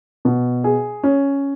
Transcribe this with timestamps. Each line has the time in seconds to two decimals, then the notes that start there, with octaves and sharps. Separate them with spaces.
0.25 B2
0.64 G#4
1.03 C#4